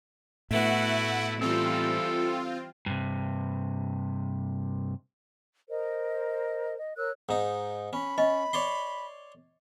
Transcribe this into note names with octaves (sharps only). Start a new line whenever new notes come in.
A2 A3 B3 E4 F#4 E5 F#5
E3 G3 C4 F4 A4
G2 C3
A#4 C5 D#5
D#5
A#4 C#5 E6 F#6
G#2 D#4
C#4 B5
C#4 D#5
C#5 D5 C6